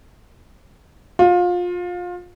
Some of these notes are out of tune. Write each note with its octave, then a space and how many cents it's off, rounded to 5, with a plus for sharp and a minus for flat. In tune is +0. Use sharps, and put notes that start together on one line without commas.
F4 +25